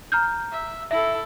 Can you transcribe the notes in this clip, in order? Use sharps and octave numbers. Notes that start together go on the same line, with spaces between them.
A#5 F6 G6
E5
E4 A4 E5